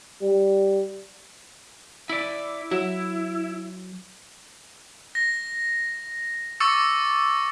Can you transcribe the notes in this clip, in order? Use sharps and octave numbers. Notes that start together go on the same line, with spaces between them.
G3
E4 D5
F#3 E4
A#6
C#6 D6 E6 A6 C#7